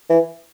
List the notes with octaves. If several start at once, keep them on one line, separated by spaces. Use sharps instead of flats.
E3